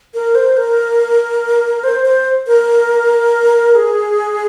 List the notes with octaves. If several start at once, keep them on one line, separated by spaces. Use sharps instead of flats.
A#4
C5
A#4
C5
C5
A#4
G#4